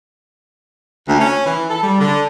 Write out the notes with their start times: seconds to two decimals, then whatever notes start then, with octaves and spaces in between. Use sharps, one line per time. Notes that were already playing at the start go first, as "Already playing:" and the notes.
1.07 D2
1.19 C#4
1.45 E3
1.68 A4
1.81 G3
1.99 D3